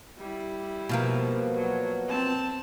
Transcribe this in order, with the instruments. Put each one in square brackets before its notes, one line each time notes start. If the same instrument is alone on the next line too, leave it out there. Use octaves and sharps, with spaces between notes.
[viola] G3 E4
[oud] B2 F3 A#3
[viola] F#3
C4 A5